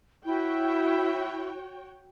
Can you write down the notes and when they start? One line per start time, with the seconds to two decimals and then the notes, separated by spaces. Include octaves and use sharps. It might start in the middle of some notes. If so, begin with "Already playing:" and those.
0.25 E4 F#4 C#5 G5